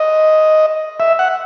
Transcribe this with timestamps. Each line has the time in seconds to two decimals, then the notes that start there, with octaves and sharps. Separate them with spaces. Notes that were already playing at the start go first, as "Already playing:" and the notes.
Already playing: D#5
1.00 E5
1.19 F#5